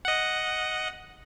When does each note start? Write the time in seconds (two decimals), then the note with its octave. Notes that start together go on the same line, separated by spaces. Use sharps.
0.05 D#5 F#5